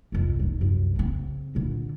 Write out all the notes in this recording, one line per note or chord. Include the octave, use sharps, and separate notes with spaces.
C2 F2
A1 D#4
C2 F#2
C#3 C4
A#2 D3